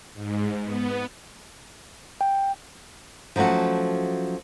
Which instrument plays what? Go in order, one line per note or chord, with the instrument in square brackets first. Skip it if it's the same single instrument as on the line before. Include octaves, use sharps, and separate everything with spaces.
[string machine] G#2
B3
[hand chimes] G5
[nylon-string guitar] F3 F#3 A3 C#4 F#4